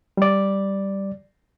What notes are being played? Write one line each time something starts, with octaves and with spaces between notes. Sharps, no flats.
G3 D5